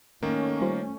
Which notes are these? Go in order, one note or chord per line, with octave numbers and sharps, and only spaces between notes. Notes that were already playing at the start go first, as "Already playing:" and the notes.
D#3 A3 A#3 C#4
G3 F4 C5